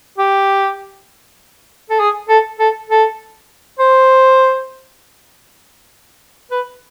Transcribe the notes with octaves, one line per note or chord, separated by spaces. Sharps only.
G4
A4
G#4
A4
A4
A4
C5
B4